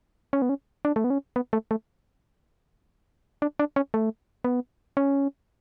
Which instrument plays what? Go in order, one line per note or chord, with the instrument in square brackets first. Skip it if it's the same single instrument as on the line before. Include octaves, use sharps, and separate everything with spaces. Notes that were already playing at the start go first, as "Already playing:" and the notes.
[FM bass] C#4
B3
C#4
D4
A3
B3
C#4
B3
A3
A3
D4
D4
C#4
A3
B3
C#4